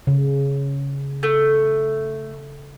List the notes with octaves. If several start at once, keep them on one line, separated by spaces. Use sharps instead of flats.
C#3
A3